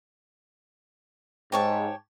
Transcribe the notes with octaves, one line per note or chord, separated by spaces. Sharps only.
G#2 G4 C#5 A5